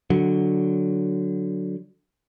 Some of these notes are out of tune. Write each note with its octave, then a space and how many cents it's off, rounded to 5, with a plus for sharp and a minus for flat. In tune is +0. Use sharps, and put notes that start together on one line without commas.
D3 +0 F#3 +0